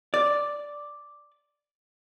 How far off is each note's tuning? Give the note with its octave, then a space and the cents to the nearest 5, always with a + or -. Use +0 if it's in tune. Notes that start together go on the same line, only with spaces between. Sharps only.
D5 +0